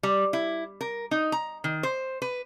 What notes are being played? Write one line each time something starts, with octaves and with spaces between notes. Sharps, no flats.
G3
E4
A#4
D#4
A#5
D#3
C5
B4